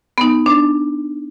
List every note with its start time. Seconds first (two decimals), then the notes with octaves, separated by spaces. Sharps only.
0.18 B3 D#4
0.46 D4